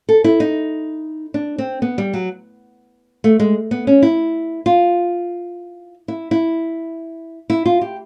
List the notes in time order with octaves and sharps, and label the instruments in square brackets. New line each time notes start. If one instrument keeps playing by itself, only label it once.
[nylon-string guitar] A4
E4
D#4
D4
C4
B3
G3
F#3
A3
G#3
B3
C#4
E4
F4
E4
E4
E4
F4
G4